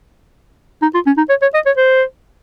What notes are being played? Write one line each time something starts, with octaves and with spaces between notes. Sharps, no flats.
D#4
F4
C#4
D#4
C#5
C#5
D#5
C#5
C5